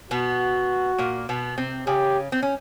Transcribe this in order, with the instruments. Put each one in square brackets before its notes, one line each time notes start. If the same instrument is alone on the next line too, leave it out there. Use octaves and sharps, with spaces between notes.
[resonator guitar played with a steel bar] B2 B3 [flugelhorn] F#4
[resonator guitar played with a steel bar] A#2 A#3
B2 B3
C3 C4
[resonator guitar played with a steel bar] C#3 C#4 [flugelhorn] G4
[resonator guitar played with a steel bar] C4
C#4